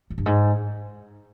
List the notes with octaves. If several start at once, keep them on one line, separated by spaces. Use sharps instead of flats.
F#2
G2
G#2